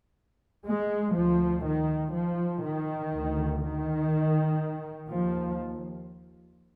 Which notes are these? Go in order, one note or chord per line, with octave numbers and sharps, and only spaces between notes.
G#3
D2 F3
D#3
F3
D#3
D2
D#3
D#2 F3